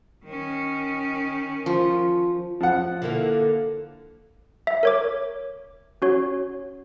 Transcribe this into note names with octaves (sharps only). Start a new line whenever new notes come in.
D#3 C#4
F3
F3 F#5
D3 A#3 E4
E5
A#4 C#5 D6
C#4 F#4 C#5